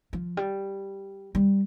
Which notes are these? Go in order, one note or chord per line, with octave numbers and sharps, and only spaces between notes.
F3
G3
G3